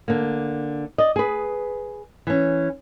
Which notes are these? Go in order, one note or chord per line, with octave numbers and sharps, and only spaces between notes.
D3 A#3
D5 D#5
G#4 B4
E3 C#4